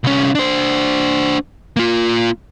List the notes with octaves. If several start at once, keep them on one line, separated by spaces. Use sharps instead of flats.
C2 C#4
D4 C5
A#3 F4